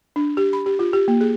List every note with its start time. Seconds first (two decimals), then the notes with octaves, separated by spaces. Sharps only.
0.16 D4
0.37 G4
0.53 B5
0.66 G4
0.79 F4
0.93 G4
1.08 A#3
1.21 G#4